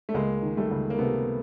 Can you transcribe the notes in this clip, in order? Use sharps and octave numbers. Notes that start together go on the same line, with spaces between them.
A3
C#2 G#3 A#3
D#3
G3 A3
C#2
A#3
C3 A3 B3